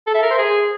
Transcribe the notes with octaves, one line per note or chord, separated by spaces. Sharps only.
A4
E5
A#4
C5
G#4